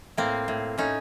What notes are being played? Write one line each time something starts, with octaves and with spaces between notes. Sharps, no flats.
A2 A#3 C4
A2
A2 C#4 D#4